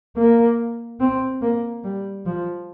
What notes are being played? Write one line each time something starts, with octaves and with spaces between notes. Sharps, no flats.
A#3
C4
A#3
G3
F3